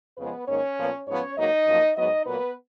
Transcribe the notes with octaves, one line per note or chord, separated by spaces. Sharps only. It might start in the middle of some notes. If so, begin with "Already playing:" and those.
F2 C#3 F3 G#3 B3 B4
G#2 D#3 A#3 C#4 C#5
A#2 F3 B3
G#2 F3 B3 C#4 C#5
G#2 F#3 A#3 D#4 D#5
F#2 F3 A#3
G#2 F#3 B3 D#4 D#5
A#2 F#3 A#3 B3 B4